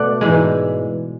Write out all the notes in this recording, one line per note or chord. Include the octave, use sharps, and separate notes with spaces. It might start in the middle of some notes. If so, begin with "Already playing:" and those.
Already playing: B2 A3 D5 F#5
G#2 E3 G#3